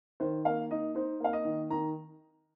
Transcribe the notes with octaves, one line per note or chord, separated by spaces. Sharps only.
D#3 C5
A#3 F5
D#4 D#5
D#4 C5
A#3 F5
D#5
D#3
D#3 A#5